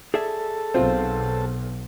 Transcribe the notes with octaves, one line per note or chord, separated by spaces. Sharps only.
G#4 A4 D5 E5
B1 C4 F4 C5